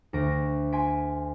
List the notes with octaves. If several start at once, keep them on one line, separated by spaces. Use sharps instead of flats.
D2 C#6 A#6 D7
G#5 C6 B6 D7